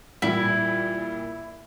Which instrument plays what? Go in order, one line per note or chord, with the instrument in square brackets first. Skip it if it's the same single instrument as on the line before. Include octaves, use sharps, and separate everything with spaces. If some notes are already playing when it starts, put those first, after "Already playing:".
[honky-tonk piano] A#2 E3 G3 [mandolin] E4